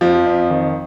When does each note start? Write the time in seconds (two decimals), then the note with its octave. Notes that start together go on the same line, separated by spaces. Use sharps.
0.01 F2 F3
0.26 F2
0.50 D#3